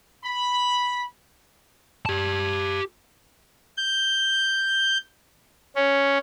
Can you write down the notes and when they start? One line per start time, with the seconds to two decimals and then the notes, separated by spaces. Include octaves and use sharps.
0.22 B5
2.06 G4 A5
3.77 G6
5.76 C#4